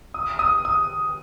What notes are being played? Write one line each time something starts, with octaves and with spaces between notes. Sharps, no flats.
D#6
D#6
D#6